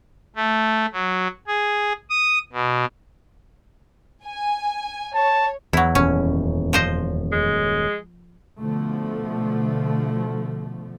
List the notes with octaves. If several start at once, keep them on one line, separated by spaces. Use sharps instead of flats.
A3
F#3
G#4
D#6
B2
G#5
C#5 A5
E2 F#3 E4
D#1 F#2 C#4
F3 C5 D#5
G#3
B2 D3 F3 A3